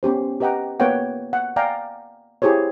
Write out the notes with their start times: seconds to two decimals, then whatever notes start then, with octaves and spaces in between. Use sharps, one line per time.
0.03 B3 C#4 G4 C5
0.41 G4 B4 D#5 F#5 G5 A#5
0.80 A#3 B3 B4 C#5 F#5 G5
1.33 F#5
1.56 D5 F5 G5 G#5 A#5
2.42 E4 G4 G#4 C5 C#5